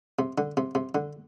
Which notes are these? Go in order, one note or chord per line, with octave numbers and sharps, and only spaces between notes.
C3
D3
C3
C3
D3